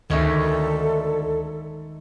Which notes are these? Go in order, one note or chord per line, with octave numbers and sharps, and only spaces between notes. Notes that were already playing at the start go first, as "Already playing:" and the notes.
D2 D#3 G#3 C#4 D#4 A4 E5